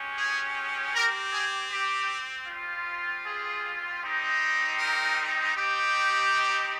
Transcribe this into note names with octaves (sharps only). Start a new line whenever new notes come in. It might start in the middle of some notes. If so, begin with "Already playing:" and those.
Already playing: G#3 C#4 G4
G#4
C4 G4 A#4
G#4
G4
G3 C4 F4
G#4
G3 C4 D#4 G4
A#4
C4 D#4 G4